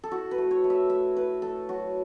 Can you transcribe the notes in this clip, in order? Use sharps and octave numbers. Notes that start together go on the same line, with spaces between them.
A4
E4 F#4
B4
A3
C#5
A3
E5
A3 E5
E4 B4
A3 A4
F#3 F#4